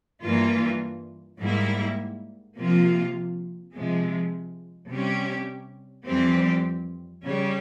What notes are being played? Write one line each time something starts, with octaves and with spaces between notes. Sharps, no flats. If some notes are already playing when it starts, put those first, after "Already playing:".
G2 E3 A#3 F4
G#2 G3 A#3 E4
C3 F3 A#3 F4
C3 F3 G#3
C3 G3 C#4 G4
F2 E3 G3 C4 G4
C#3 G3 C#4